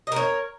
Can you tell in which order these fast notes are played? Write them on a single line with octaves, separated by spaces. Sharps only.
D#5 A#4 C#5